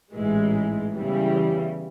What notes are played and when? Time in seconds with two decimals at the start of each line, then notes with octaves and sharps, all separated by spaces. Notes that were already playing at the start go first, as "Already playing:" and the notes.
0.11 A1 G#2 E3 G#3
0.93 E2 C#3 E3 G3